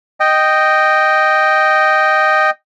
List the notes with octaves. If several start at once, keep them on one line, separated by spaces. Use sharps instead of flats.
D#5 G5